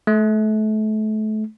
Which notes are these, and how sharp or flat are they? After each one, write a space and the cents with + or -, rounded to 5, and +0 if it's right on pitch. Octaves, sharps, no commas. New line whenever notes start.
A3 -30